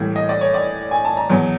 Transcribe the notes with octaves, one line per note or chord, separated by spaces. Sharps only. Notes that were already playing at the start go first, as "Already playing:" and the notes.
Already playing: A2 E3 G3 A#3
D#5
D5
C#5
D5
G#5
A5
A#5
E2 B2 F#3